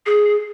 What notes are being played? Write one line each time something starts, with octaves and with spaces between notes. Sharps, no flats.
G#4